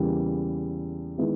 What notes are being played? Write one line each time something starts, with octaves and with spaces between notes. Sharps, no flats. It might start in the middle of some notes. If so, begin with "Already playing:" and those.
Already playing: E2 C#3 G3 A#3
D#3 G#3 B3 E4